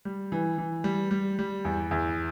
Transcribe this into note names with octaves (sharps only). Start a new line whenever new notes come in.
G3
E3
E3
G3
G3
G3
E2
E2